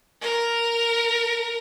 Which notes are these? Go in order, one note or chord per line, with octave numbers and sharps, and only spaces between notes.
A#4